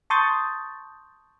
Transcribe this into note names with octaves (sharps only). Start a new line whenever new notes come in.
A5 C6 C#6 D#6 G6 A6